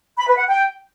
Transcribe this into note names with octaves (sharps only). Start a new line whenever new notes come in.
B5
B4
F#5
G5